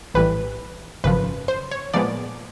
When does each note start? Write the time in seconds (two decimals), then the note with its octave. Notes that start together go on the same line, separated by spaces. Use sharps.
0.14 A#1 A2 E3 G3 B4
1.04 G#1 F#2 C#3 F3 B4
1.48 C5
1.71 C#5
1.94 A#2 F3 G#3 B3 D5